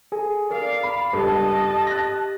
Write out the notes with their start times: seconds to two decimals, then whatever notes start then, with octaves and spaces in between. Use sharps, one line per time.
0.12 G#4 A4 G#5
0.51 A#4 D5 F5
0.83 B5
1.13 C#2 G2 G4 A4 D#5 A5
1.87 F#6 A6 A#6